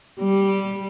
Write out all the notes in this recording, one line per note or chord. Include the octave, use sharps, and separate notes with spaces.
G3